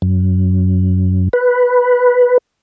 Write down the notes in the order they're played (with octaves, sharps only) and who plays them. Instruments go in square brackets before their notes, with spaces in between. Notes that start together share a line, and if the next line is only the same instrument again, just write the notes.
[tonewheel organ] F#2
B4